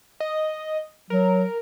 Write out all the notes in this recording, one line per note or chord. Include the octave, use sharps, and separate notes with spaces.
D#5
F#3 A#4